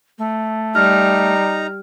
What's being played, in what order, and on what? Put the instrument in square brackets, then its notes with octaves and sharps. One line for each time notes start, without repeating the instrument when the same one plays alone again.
[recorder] A3
[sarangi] G3 [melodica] D#4 A#5 [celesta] F6